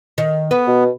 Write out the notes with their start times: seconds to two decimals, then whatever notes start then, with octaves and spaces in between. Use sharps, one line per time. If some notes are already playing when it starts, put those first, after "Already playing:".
0.18 D#3
0.51 B3 B4
0.67 B2